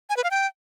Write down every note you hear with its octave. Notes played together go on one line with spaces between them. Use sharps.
G#5
B4
F5
G5